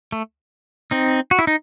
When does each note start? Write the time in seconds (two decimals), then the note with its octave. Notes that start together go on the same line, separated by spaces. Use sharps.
0.12 A3
0.91 C4 D#4
1.31 F#4
1.39 E4
1.47 D#4